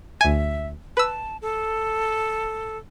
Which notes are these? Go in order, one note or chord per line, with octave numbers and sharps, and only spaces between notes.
D2 E5 G#5
B4 A5 E6
A4